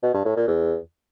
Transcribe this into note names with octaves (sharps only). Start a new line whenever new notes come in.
B2
G2
A2
A#2
E2